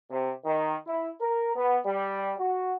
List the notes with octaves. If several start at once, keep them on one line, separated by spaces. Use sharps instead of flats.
C3
D#3
E4
A#4
B3
G3
F#4